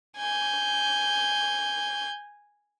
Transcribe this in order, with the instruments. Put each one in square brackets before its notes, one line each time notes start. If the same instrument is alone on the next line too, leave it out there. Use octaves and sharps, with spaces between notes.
[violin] G#5 G6